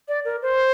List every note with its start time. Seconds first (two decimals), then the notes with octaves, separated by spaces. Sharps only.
0.08 D5
0.25 A#4
0.42 C5